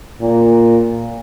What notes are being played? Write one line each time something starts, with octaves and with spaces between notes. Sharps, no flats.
A#2